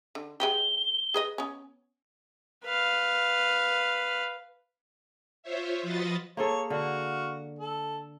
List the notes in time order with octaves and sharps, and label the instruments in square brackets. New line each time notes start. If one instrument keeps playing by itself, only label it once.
[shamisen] D3
[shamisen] G#3 B3 G4 [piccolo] G7
[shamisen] G#4 B4 D#5
B3 C#4
[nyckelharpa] B4 F5
[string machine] F4 C5 C#5 E5
F3 F4 F#4 B4 D#5 A6
[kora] A#3 G#4 A4 [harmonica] C#5
[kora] D3 [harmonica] F#4 F5
[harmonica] A4